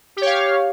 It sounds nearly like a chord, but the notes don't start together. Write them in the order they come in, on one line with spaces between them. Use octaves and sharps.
G4 C#5 F5